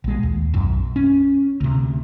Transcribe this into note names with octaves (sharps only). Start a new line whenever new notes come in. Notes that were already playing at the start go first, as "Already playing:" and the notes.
A#1 G#3
D#2
B1 F#2
C#4
D2 C3